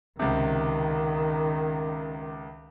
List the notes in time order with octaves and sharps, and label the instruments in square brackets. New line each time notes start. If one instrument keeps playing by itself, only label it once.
[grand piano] C#2 C3 [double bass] D#3